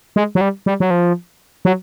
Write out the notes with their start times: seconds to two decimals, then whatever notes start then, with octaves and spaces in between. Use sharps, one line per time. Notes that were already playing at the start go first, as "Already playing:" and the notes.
0.16 G#3
0.35 F#3
0.41 G3
0.66 G3
0.80 F#3
0.90 F3
1.65 F#3